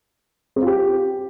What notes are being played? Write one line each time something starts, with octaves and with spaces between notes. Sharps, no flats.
C4
F4
G4